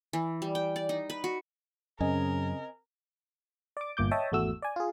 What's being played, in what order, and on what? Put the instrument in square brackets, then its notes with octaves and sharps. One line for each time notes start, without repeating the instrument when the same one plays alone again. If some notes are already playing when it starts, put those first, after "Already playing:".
[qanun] E3
G3
G5
D5
D#4
B4
F#4
[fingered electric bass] F#2 [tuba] C#3 [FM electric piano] C4 D#5 G#5 [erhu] A#4
[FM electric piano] D5 D6
G1 A#2 D6 G6
C#5 D#5 E5 G5 A5 D#6
G#1 E2 A3 F#4 E6
D5 G#5
F4 G#4